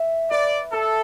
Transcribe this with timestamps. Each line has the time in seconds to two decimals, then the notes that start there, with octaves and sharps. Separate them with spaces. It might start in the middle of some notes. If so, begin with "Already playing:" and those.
Already playing: E5
0.31 B4 D5
0.73 A4 D5